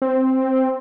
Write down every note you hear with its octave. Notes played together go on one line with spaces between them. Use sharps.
C4